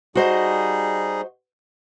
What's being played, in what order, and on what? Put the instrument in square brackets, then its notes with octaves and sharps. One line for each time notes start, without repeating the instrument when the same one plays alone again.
[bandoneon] G3 D#4 G#4 [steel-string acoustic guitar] F#4 C5 D#5